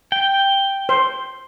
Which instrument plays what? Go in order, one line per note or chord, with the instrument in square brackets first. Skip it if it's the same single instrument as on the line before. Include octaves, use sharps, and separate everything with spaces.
[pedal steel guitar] G5
[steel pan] C5